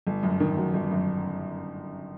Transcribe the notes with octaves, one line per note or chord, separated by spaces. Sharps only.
G1
F#2
D#3
F#3
G1
F#2